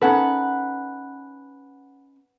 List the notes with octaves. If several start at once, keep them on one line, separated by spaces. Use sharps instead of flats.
C#4 D#4 A4 B4 F#5